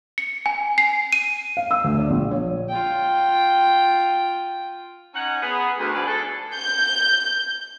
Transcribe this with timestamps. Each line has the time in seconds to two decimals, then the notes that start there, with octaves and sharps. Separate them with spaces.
0.18 C#7
0.46 G#5
0.78 C7
1.13 D#7
1.57 F5
1.71 E6
1.84 D2
1.99 D5
2.10 A#1
2.31 C#5
2.69 F4 G5
5.14 C#4 D#4 F#5
5.42 B3 G#4
5.78 D2
5.95 G#2 B2 F3 G#4 B4 D5
6.06 G#4 A4
6.54 G6